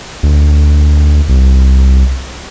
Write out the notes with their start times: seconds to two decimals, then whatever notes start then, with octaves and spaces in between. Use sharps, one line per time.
0.23 D2
1.29 C2